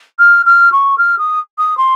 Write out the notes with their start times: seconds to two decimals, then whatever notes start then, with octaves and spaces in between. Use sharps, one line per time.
0.19 F6
0.46 F6
0.72 C#6
0.98 F6
1.18 D#6
1.58 D#6
1.77 C6